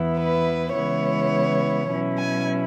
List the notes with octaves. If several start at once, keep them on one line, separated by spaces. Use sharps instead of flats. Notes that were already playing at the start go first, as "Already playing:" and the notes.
Already playing: E2 E3 B3 E4
B4
C#3 E3 G#3 B3 E4 C#5
B2 F#3 C#4 E4
G#5